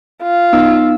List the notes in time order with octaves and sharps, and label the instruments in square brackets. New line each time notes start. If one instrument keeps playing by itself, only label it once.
[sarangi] F4
[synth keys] B3 D#4 E6